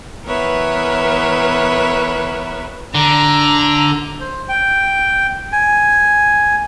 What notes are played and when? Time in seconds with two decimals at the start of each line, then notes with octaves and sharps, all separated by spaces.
0.23 E3 B3 A#4 B4 C#5 E5
2.95 D3 A#5
4.20 C5
4.49 G5
5.52 G#5